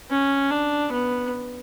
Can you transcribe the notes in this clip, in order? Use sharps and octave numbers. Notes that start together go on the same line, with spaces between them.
C#4
D4
B3